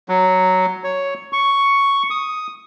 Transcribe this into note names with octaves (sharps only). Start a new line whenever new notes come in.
F#3
C#5
C#6
D#6